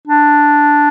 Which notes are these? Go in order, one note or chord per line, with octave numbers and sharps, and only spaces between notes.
D4